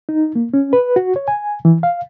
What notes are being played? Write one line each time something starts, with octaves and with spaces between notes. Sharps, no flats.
D#4
A#3
C#4
B4
F#4
C#5
G#5
E3
F5